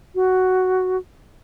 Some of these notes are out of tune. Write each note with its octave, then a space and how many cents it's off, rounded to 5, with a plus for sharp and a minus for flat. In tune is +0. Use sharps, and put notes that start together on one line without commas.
F#4 +5